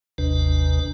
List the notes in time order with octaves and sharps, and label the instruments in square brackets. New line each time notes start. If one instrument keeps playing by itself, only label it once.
[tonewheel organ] G#1 D#2 C3 D4 B4